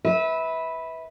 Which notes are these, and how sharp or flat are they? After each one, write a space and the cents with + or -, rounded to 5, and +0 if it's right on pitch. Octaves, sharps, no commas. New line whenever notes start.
B4 +0 E5 -25